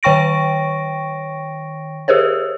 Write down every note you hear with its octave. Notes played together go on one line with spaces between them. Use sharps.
D#3 C#5 G5 C#6 A#6 D7
G4 G#4 A#4 C5 C#5